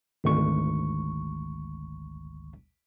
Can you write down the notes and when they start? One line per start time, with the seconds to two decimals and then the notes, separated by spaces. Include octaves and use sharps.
0.24 G#1 D2 C#6